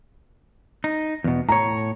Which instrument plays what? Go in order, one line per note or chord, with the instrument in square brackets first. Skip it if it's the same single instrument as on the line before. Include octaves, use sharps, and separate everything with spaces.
[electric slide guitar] D#4
E2 B2
[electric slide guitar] A2 C#5 [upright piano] A#5